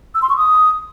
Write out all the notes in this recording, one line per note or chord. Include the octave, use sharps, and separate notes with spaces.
E6
C6
C#6
D#6